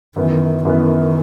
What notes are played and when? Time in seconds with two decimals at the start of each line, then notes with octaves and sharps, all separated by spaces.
0.16 F#2 D#3 E3 B3
0.65 F#2 D#3 E3 B3